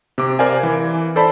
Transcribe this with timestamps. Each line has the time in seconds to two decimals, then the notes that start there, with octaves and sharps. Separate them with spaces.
0.18 C3 D6
0.39 A#4 C5 D5 F5 G#5
0.63 E3
1.16 A4 C5 D5 A5 B5